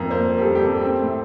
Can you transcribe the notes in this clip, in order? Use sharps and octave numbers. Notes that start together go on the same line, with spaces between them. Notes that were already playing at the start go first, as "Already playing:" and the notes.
Already playing: F2 A#3 A#5
A#3 C5
A#3
G4
A4
G3
G4
C3
A4
C4
A2